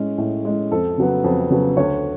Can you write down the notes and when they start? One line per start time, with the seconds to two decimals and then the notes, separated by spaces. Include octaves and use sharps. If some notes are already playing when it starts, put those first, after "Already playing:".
Already playing: A2 G#3 C#4
0.18 A2
0.45 G#3 C#4
0.71 F2 A4
0.98 C#3 F#3 B3
1.24 F2
1.51 C#3 F#3 B3
1.77 D2 C#5